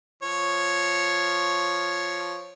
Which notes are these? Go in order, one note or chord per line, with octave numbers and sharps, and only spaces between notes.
F3 C#5